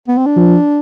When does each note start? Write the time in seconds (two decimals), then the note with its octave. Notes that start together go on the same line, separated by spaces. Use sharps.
0.08 B3
0.18 C4
0.26 D4
0.36 F3